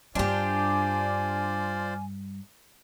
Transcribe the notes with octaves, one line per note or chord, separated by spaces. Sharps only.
G2 G3 D4 F4 G4 C5 D5 G#5